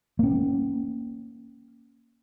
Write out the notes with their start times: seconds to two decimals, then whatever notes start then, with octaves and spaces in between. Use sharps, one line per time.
0.19 A#3 C#4